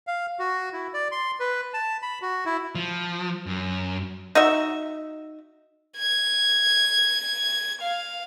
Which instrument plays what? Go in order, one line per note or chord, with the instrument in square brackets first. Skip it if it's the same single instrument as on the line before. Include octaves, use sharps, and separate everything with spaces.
[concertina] F5
F#4
E4
D5
C6
B4
A5
B5
F#4
E4
[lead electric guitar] F3
F#2
[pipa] D#4 F#4 E5
[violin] G#6
F5